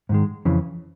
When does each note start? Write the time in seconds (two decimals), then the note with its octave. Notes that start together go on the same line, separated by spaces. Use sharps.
0.09 G#2 D#3 G#3
0.45 F2 C#3 E3